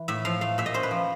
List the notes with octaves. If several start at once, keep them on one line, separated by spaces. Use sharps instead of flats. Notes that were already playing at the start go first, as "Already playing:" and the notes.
Already playing: E3
A2 E5
F3 F5
A3 F5
A#2 E5
D#5
C#4 C5
B4
F3